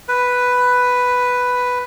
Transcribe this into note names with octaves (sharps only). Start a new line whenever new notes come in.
B4